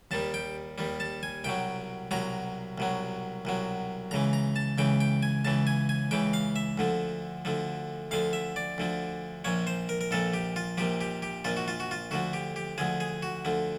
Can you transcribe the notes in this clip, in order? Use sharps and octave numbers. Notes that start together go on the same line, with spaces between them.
D#2 D#3 G3 A5
G5
D#2 D#3 G3
A5
G#5
C2 B2 F#3 G5
C2 B2 F#3 A#5
C2 B2 F#3
C2 B2 F#3
C#2 C#3 E3 A#5
A#5
A5
C#2 C#3 E3 G5
G5
G#5
C#2 C#3 E3 A5
G#5
G#5
C#2 C#3 E3 G5
F5
E5
D2 D3 F3
D2 D3 F3
D2 D3 F3 F5
E5
D5
D2 D3 F3
A#1 A#2 F3 C#5
C5
A#4
A#4
A#1 A#2 F3 A4
G4
F4
A#1 A#2 F3 G4
G4
G4
A#1 A#2 F3 F4
F#4
F4
F#4
F4
D2 D3 F3 F#4
G4
G4
D2 D3 F3 G#4
G#4
F#4
D2 D3 F3